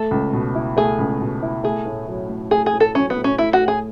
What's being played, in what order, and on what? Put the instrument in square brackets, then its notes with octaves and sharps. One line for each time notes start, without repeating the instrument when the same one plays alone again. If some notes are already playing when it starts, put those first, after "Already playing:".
Already playing: [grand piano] A3 [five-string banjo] A4
[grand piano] C#2
B2
E4
[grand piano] A3 [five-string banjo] G#4
[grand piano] C#2
B2
E4
[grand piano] A3 [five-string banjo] G#4
[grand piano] A2
F#3
A2
[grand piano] A3 [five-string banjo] G#4
[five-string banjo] G#4
[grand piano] A2
[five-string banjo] A4
[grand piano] F#3 [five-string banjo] C#4
[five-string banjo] B3
[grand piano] A2
[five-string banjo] C#4
[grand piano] A3 [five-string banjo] E4
[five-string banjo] F#4
[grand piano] A2
[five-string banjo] G#4